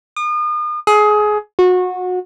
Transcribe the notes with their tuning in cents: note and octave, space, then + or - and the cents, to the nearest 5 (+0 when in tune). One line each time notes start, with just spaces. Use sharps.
D#6 -40
G#4 +20
F#4 -25